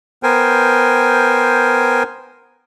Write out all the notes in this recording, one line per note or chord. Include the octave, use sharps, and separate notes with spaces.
B3 A#4 C5 G5 G#5